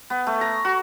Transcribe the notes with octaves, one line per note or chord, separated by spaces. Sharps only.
B3
A3
A#5
F#4